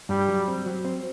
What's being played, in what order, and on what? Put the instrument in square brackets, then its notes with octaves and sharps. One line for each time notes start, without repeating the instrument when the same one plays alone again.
[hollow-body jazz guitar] G2 [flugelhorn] G3
[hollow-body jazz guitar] F#3
C4
F#3
C4